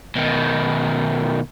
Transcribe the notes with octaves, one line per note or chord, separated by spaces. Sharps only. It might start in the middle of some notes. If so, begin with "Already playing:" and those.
B2 D#3